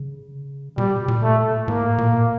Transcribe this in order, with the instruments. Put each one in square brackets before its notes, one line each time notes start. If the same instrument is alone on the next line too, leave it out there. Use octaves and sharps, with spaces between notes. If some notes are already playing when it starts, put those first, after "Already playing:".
Already playing: [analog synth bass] C#3
[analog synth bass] B2 [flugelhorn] G3
[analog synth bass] A#2
[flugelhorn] A3
[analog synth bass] A2
[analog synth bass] A2 [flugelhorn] A#3
[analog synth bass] A#2